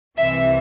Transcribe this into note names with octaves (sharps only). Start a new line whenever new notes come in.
C2 C3 E3 E5